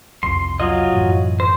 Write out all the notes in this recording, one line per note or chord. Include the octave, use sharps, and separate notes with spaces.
C2 F2 C6
F#3 F4 D#5
F#2 A2 E3
C5